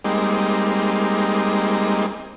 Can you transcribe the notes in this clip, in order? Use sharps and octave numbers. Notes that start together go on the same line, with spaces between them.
G3 G#3 A#3 C4 D#4